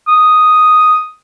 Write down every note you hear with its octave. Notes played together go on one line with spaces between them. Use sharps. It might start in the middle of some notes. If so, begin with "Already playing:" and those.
D#6